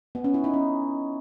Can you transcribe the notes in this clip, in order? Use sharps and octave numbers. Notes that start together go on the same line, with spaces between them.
B3
C#4
E4
D#4
C#4